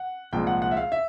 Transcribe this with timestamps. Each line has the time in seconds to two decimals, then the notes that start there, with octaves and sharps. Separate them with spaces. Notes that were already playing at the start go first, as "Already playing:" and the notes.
Already playing: F#5
0.33 C2 A#2 F3 G#3 G5
0.47 F#5
0.62 F#5
0.71 E5
0.77 F5
0.92 E5